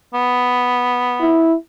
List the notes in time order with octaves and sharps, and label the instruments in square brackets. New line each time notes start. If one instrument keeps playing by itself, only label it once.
[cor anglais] B3
[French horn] E4